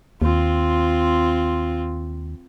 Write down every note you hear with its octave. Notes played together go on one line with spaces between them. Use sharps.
D#2 C4 F4